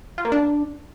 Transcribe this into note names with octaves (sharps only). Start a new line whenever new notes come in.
F4
A#3
D4